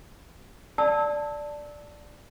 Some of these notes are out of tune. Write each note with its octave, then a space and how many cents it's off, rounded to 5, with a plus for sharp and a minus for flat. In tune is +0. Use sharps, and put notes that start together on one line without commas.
D5 +0 A5 +5 E6 -25